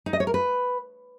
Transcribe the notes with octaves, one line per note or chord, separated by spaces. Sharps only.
D#4
D#5
C#5
A#4
B4